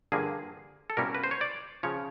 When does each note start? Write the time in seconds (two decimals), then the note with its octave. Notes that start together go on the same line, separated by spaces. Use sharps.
0.12 G2 D3 F3 A#3 G#4
0.90 A4
0.97 C2 B2 G3 A#3 C#4 A#4
1.15 B4
1.24 C5
1.31 C#5
1.41 D5
1.83 C#3 F3 C#5